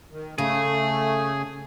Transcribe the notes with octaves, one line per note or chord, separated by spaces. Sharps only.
D#3
C#3 A3 G#4